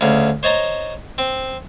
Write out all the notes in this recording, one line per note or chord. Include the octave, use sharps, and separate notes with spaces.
D2 C#3
C5 C#5 D#5 A5 A#5
C4